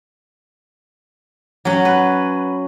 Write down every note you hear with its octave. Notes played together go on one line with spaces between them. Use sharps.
F#3 C#4
B4